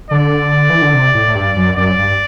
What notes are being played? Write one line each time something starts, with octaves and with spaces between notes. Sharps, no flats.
D3 D5
E3
D3
C3
A2
A2
G2
F#2
F#2 D5
G2